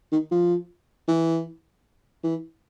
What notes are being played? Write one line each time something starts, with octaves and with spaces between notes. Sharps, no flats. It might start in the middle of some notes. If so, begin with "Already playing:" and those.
D#3
F3
E3
E3